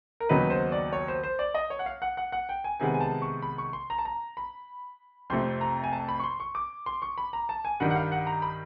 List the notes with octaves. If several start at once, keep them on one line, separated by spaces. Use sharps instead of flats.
A#4
D#2 C#3 F#3 B3 D#4 B4
C5
D5
C#5
C5
C5
D5
D#5
C#5
F#5
F5
F#5
F#5
F#5
G5
G#5
C3 D#3 G#3 B3 G#5
G#5
A5
C#6
B5
C#6
C6
A#5
A5
A#5
B5
F2 C3 F3 A3 C6
A#5
G#5
A5
B5
C#6
C6
C#6
D6
C6
C#6
B5
A#5
A5
G#5
G2 D#3 G3 F#5
F#5
F5
F#5
A#5
B5